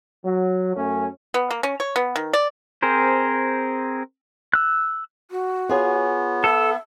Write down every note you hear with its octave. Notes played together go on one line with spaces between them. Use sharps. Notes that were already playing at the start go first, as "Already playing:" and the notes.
F#3
F#2 A3 C#4
B3
A#3
C#4
C#5
B3
D#3
D5
C4 G#4 A#4 C5
E6 F#6
F#4
B3 F4 G#4 C#5
A4 E5